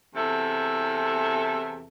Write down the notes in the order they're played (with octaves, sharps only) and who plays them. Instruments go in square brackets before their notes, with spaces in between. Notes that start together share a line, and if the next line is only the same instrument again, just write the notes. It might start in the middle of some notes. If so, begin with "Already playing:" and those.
[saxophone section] E2 C3 A4 E5